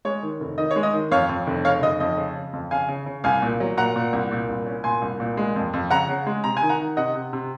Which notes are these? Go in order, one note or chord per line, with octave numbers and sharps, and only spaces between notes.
G#3 C#5
D#3
F1
D#3 D#5
C#5
G#3
D#5
D#3
F2 C#5 F5
F2
F1
C#3 C#5 F5
F1 D#5
F2 D#5
C#3
C#3
F2
C#3 F5 G#5
C#3
C#3
C2 F5 G#5
A#2
F#3
A#2 F#5 A#5
A#2
C2
A#2
C2
C#4
A#2 G#5 C6
C2
A#2
G#3
F2
F2
C#3 F#5 A#5
C#3
G#3
C3 A#5
G#5
D#3
F#5 A#5
D#3
C3 D#5 F#5
C3
C3